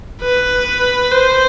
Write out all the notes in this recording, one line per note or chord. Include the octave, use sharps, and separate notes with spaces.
B4
C5